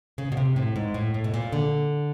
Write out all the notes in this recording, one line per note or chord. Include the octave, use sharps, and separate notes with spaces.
C#3
B2
C3
A2
G#2
A2
A2
B2
A#2
D3